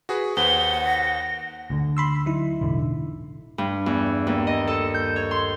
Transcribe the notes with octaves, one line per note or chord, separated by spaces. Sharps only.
F#4 G#4 B4
D#2 B4 C5 F#5 G7
A#6
D2 D3
B5 C6 E6
F#3 D#4 E4
E1 A1 D3
G2
E2
D#2
D#5
A4
G6
C#5
C6